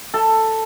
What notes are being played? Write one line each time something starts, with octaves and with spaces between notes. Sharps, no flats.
A4